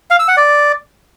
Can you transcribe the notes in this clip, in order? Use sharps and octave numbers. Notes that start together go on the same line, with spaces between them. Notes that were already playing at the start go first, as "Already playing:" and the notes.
F5
E6
F#5
D5